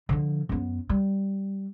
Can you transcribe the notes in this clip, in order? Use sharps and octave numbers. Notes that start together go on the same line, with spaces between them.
D3 F3
F#2 B3
G3